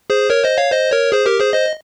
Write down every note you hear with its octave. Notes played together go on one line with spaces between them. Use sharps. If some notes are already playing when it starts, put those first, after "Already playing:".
G#4 C5
A#4 C#5
C5 D#5
C#5 F5
C5 D#5
A#4 C#5
G#4 C5
G4 A#4
G#4 C5
C5 D#5